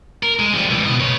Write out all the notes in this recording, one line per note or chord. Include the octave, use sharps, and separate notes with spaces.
A#4
G#3
F3 G3
C#2 E3
B2 D#5
B4 C#5